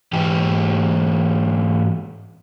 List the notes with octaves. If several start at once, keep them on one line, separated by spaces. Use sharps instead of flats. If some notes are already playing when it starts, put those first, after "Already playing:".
G#2 E3 G4 G5